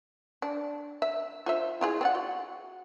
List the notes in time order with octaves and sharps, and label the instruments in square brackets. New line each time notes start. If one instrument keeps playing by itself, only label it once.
[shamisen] D4
E5
F4 C5 E5
E4 F4 G#4
C4 D5 F#5
F#4